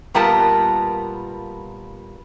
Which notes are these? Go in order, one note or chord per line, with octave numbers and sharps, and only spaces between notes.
A#2 G3 B3 F4 A#4 A5